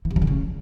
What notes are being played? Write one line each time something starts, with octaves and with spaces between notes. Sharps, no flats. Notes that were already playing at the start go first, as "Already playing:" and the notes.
E3
C3
F3
D3
C#3